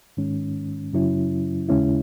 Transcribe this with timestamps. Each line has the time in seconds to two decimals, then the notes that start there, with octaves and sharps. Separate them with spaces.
0.17 G#2 D#3 G#3 C#4
0.93 F#2 C#3 F#3 C#4 E4
1.69 D#2 C#3 G#3 C#4 E4